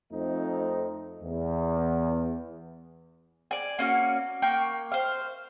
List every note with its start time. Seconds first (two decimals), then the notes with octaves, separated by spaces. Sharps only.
0.12 F2 A3 C4 D#4
1.23 E2
3.51 D5 G#5
3.79 A#3 C#4 F#4
4.42 A#3 G5 C#6
4.92 C5 F5